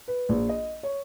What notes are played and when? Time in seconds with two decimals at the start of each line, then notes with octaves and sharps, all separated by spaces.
0.08 B4
0.29 A#1
0.49 D#5
0.83 C#5